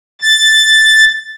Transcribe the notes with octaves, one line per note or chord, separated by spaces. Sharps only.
A6